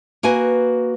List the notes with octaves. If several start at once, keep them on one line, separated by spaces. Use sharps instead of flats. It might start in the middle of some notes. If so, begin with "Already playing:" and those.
A#3 F#4 B4 G#5